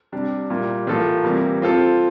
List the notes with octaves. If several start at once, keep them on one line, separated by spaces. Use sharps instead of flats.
C3 G3 D4
A#2 G3 A#3 E4
A2 E3 A#3 F4 A4
C3 E3 G3 A#3 E4
F3 C4 F4 A4